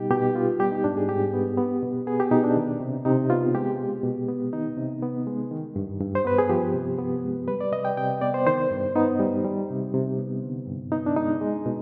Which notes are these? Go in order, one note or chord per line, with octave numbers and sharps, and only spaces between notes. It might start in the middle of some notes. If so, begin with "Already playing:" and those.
Already playing: B2 G3 D#4 G4
B2 G4
B3 F4
G3 G4
D#4
G#2 D4
G#4
G#2 G4
B3
B3
B2
B3 G#4
G4
B2 D#4
D4
D#3
C3
C3 D#4
B3 F4
G#3 G4
B2
B2
B3
D#3 D#4
C3
B3
G#3
D#3
G2
G2
C5
B3 B4
G#4
F3 G4
C3
B3
G#3
G3 B4
D5
C3 D#5
G5
C3 G5
B3 D5
C5
D#3 C5
G2
B3 D#4
G3
G3
C3
C3
B3
D3
G2
B3 D#4
D4
G#3 D#4
G#3
B2